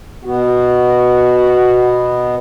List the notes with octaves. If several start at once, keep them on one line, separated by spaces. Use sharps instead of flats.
B2 B3 F#4